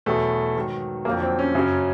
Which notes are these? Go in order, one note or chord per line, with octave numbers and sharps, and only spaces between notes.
E2 B2 F#3 A3
G#2 D#3 F#3
F2 D3 F#3 A#3
C4
C#4
F#2 C#3 F#3